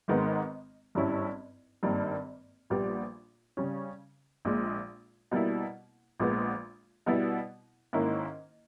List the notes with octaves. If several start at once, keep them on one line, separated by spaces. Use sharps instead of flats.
G#1 G#2 D#3 G#3 B3
G#1 G2 G3 C#4 E4
G#1 G2 D#3 G3 A#3
A#1 A#2 G3 B3 G4
C#3 G3 C#4
A#1 A#2 G#3
B2 G3 A#3 E4
A#1 A#2 G#3 B3
B2 G3 B3 E4
G#2 D#3 A#3 C#4 E4